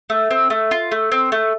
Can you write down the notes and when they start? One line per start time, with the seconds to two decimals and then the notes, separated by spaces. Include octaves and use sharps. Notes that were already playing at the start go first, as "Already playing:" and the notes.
0.10 A3
0.31 C4
0.50 A3
0.71 F4
0.92 A3
1.12 C4
1.32 A3